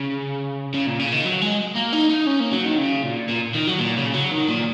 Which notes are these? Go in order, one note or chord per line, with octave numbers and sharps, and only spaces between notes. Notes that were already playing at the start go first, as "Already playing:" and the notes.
Already playing: C#3
C#3
A#2
C#3
D#3
F#3
G#3
A#3
D#4
D#4
C#4
A#3
F#3
D#3
C#3
A#2
A#2
D#3
F#3
A#2
C#3
F#3
D#3
A#2